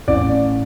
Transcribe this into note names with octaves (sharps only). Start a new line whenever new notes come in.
A1 D5